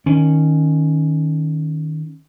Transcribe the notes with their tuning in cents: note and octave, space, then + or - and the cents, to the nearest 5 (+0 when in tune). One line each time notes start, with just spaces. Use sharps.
D#3 +0 C#4 +0